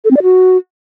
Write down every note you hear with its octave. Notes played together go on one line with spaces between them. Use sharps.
A4
C4
D5
F#4